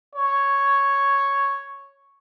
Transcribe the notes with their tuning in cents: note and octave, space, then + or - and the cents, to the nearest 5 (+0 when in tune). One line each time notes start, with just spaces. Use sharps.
C#5 +0